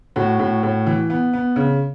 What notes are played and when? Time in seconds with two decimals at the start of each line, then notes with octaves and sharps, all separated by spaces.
0.16 A2 F#4
0.39 A2
0.63 A2
0.87 E3
1.10 B3
1.33 B3
1.56 C#3